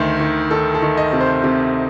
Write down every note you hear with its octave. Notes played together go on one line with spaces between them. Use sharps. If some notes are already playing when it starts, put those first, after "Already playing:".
Already playing: D2 D#3 C5
D#3
D#3 A4
A4
D#3
D#5
C3
C5
C3